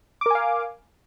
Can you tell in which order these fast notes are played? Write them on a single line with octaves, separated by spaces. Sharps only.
D6 A#4 G#5 F5